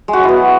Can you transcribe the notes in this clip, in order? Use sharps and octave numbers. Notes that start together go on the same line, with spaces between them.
G#3
F#4
F#3
E4
B3